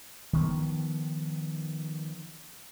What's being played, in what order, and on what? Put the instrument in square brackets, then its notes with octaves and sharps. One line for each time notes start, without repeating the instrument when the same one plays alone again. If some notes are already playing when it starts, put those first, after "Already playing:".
[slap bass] D#3 F3 B3